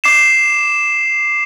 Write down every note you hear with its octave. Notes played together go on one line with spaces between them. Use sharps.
D6 C7 E7